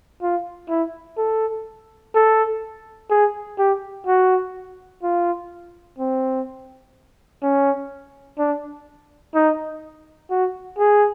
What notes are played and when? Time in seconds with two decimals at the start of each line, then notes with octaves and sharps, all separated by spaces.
0.22 F4
0.69 E4
1.18 A4
2.15 A4
3.10 G#4
3.58 G4
4.07 F#4
5.03 F4
5.98 C4
7.42 C#4
8.38 D4
9.35 D#4
10.31 F#4
10.78 G#4